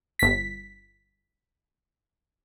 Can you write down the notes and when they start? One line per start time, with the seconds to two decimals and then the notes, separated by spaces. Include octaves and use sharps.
0.19 G1 B6